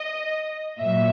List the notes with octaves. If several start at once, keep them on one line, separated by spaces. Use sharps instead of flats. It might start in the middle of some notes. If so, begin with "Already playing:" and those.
Already playing: D#5
A#2 F#3 E5